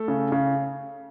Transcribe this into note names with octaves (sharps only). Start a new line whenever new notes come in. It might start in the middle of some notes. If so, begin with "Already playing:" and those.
Already playing: A3 A4
C#3
C#3